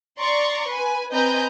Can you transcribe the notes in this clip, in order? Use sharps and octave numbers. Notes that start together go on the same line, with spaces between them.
D5 A#5 C6 C#6
B4 G#5
C4 B4 D#5 G#5 A#5 G6